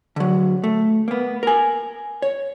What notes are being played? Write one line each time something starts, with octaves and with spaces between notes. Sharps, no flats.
D3 F#3
A3
A#3 B3
A#4 G#5
C#5